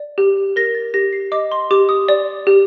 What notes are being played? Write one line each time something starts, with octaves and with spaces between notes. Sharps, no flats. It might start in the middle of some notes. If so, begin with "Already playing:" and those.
Already playing: D5
G4
A#4 A#6
A6
G4 A#6
C7
D#5 D6
C6
G4 D6
D#6
D5
G4